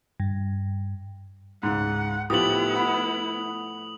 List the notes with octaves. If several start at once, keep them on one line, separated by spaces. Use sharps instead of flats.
G2
C#2 G#2 F#5
A2 F3 B3 E4 G4 D#6 F#7
F#5 B5